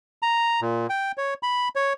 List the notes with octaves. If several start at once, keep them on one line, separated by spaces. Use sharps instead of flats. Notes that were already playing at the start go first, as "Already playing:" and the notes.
A#5
A#2
G5
C#5
B5
C#5